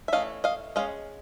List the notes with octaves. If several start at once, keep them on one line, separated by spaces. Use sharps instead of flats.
E5
E3 A3 C#4 D#5 F5
D#5 F5
G#3 C#4 D#5 F5